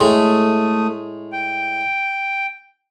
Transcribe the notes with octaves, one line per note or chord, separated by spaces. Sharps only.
A2 G#3 A3 D#6
G5